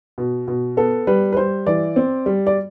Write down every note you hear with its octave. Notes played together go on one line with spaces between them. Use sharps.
B2
B2
B3 A4
G3 B4
B4
G3 C5
E3 D5
C4
G3
D5